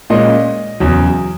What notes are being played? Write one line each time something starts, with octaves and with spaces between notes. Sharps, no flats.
A#2 G#3 C#4 D#5
E2 C#3 F#3